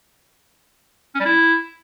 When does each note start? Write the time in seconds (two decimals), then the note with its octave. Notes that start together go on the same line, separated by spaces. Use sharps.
1.15 C#4
1.20 G3
1.25 E4